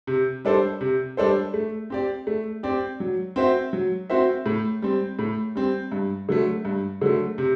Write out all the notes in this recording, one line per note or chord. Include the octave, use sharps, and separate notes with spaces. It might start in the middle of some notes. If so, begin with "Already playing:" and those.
C3
G3 D4 A4 C5
C3
G3 D4 A4 C5
A3
C4 G4 D5
A3
C4 G4 D5
F#3
C4 F#4 C5 E5
F#3
C4 F#4 C5 E5
A2
G3 C4
A2
G3 C4
G2
D3 F#3 A3
G2
D3 F#3 A3
C3